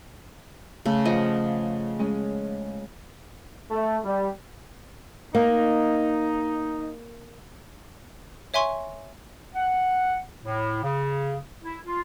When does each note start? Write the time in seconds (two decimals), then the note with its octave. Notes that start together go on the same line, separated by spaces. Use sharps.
0.86 C#3 A3
1.05 F3 D#5 F#5
1.99 G#3 C#4
3.71 A3
4.04 G3
5.35 A#3 D#4
8.54 C#5 E5 G#5 C6 C#6
9.55 F#5
10.44 A2
10.83 C#3
11.63 E4
11.86 F4